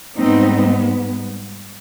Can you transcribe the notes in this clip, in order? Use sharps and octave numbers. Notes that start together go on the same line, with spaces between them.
G#2 G3 B3 C4 D#4